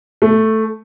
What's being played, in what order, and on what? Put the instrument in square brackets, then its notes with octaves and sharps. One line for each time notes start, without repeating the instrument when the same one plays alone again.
[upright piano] A3